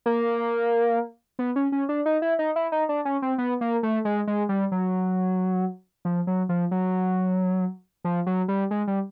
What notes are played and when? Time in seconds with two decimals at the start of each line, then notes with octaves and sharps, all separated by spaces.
0.06 A#3
1.39 B3
1.56 C#4
1.72 C#4
1.89 D4
2.06 D#4
2.22 E4
2.39 D#4
2.56 E4
2.72 D#4
2.89 D4
3.05 C#4
3.22 C4
3.38 B3
3.61 A#3
3.83 A3
4.05 G#3
4.27 G#3
4.49 G3
4.72 F#3
6.05 F3
6.27 F#3
6.49 F3
6.71 F#3
8.04 F3
8.26 F#3
8.48 G3
8.71 G#3
8.87 G3